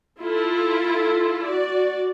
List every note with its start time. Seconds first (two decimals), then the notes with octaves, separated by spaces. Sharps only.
0.21 E4 F4 A4
1.45 F#4 D5